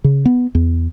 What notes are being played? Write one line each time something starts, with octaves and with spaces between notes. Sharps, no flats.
C#3
B3
E2